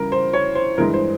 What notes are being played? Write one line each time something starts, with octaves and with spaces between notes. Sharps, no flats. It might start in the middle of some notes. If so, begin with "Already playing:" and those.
Already playing: C#3 E3 G3 A#4
C5
C#5
C5
G2 E3 G#3 A#4
C5